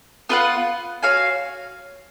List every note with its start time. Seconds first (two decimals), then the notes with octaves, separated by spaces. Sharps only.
0.29 B3 F4 B4 F#5
1.03 F#4 C#5 F5 G#5